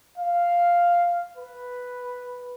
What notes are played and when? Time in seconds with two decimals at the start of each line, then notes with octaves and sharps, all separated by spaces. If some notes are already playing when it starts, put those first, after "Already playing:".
0.18 F5
1.37 B4